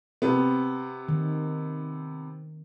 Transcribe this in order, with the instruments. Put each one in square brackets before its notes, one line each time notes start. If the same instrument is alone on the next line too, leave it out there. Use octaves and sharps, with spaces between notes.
[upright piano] C3 B3 [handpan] C4
[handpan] D#3